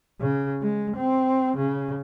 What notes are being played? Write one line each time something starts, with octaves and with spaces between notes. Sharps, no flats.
C#3
G#3
C4
C#3